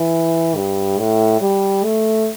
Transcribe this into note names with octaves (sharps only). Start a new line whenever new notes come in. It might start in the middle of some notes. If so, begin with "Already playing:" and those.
Already playing: E3
G2
A2
G3
A3